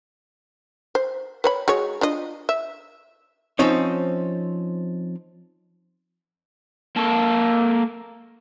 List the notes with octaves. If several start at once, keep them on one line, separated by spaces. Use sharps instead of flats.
C5
B4 C#5 B5
G#3 F#4 C#5
D4 F4 D#5
E5
F3 C4 C#4 D#4 C#5
A#3 A4